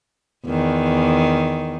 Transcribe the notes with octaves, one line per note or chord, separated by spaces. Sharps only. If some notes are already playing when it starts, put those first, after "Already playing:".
E2 D#3